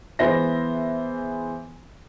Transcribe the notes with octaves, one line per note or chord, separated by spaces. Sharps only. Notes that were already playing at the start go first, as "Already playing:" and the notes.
E3 G#3 B3 C5 E5 A#6